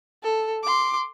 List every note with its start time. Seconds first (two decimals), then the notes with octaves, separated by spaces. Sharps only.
0.23 A4
0.63 C6 D6